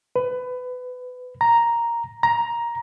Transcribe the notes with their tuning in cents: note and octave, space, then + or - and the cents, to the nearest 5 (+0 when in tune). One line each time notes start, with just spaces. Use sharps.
B4 +20
A#5 +0
A#5 +10